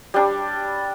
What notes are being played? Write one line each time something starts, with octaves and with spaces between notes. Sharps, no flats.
G3 D4